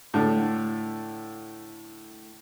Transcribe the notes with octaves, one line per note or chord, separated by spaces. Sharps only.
A2 D3 A3